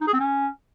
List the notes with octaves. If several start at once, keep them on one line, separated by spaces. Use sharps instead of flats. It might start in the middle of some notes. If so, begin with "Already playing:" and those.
D#4
G#4
C4
C#4